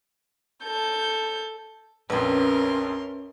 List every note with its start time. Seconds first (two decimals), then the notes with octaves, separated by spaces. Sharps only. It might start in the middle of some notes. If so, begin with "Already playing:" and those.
0.63 A4 G6
2.10 A#1 F2 C#4 A#4 B4 E5 C6